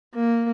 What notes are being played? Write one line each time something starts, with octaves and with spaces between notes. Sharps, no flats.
A#3